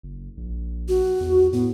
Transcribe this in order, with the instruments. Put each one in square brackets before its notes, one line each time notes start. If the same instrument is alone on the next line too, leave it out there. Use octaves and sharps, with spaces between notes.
[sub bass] F#1
A#1
[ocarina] F#4
[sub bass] E2
[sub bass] A2 [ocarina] B3